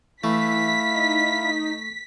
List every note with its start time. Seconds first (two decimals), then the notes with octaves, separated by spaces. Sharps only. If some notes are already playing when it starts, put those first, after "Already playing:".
0.24 E3 A3 E4 F5 B6
0.94 D#4